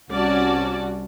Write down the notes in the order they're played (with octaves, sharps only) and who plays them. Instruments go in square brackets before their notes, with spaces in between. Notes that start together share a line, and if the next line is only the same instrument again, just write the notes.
[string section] C2 F#4 [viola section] C#4 D5 A5